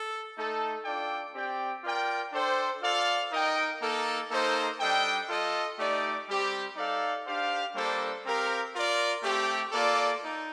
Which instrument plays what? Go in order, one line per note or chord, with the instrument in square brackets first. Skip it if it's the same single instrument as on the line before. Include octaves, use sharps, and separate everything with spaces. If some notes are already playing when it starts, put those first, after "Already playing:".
Already playing: [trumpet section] A4
A3 D#4 A4
D4 F4 A4 D5 G5
C4 G4 D5 G5
F4 A#4 D5 G5
D4 A4 C5 G5
F4 A4 D5 F5
D#4 A#4 D#5 G5
A#3 D#4 A4
A#3 D#4 A4 C5
G3 D4 A4 D#5 G5
F4 A4 D#5
A3 D#4 G4 D5
G3 C4 G4
D#4 A4 D5 F5
D4 G4 C5 F5
G3 A#3 D4 A4 C5
C4 G4 A#4 F5
F4 A#4 D5
A3 C4 G4
A#3 F4 A4 D5
D#4